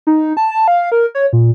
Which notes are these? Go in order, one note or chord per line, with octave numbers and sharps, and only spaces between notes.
D#4
A5
A5
F5
A#4
C#5
A#2